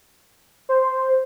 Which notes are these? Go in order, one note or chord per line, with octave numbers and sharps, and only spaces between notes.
C5